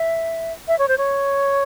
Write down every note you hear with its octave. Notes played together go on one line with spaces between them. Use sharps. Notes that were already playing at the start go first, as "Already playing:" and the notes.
Already playing: E5
E5
C#5
C5
C#5